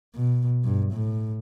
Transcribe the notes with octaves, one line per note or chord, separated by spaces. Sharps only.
B2
G2
A2